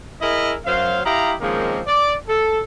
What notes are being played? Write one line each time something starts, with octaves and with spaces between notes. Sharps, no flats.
E4 G#4 A#4 D#5 E5
F#2 F#3 C5 F5
E4 G4 D#5 F5 A#5
D#3 F3 G#3 A#3 C4 C#4
D5
A4